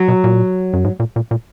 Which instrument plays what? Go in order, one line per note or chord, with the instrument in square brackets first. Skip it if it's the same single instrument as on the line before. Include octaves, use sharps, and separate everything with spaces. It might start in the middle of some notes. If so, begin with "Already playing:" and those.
Already playing: [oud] F#3
[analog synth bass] B2
A#2
F#2
G#2
A#2
A#2
A#2